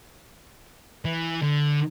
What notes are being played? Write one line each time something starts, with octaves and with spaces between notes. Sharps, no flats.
E3
D3